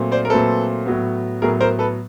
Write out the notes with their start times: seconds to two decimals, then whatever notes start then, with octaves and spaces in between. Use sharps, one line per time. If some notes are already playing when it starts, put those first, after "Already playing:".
Already playing: A#2 F#3 A3 C4
0.11 C5 D5
0.25 A#4
0.30 A#2 F#3 A3 C4 A4 B4
0.86 A2 F#3 B3
1.42 A2 F#3 B3 G#4 A#4
1.61 A#4 C5
1.79 A4 B4